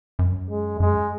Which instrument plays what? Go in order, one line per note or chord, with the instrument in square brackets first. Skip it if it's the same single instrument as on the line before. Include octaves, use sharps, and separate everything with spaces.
[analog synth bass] F#2
[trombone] G#3
[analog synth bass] F#2 [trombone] G#3